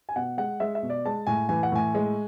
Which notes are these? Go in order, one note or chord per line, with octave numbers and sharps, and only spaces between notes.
G#5
B2 F#5
G#3 F#5
G#3 E5
E5
B2
D5
G#3 A5
A2 G#5
E3 G#5
F#5
A2 G#5
G#3